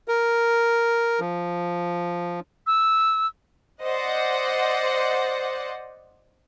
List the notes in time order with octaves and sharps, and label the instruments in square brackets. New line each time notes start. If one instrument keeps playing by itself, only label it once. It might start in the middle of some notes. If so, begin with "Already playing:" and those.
[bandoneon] A#4
F3
[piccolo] E6
[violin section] C5 D5 D#5 F#5